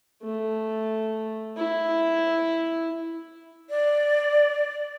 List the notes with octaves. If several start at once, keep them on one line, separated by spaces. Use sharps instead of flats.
A3
E4
D5